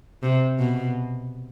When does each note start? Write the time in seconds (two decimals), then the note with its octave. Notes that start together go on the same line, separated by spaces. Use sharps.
0.23 C3
0.59 B2